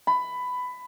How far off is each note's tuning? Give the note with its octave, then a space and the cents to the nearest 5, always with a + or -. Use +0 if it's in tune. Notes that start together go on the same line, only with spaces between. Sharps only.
B5 +15